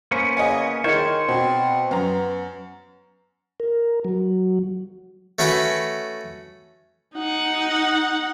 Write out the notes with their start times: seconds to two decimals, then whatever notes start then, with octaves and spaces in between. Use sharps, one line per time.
0.11 A#3 B3 C#4 C5
0.37 C#3 D#5 F#5 G#5
0.84 D#3 D#4 F4 G#4 C5 C#5
1.28 B2 C4
1.91 F#2 B3 A#5
3.60 A#4
4.05 F#3
5.39 A3 C#4 F#4 B4 G5
7.16 D#4 F#5